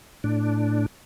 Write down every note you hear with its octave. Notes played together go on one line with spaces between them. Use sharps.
A2 D4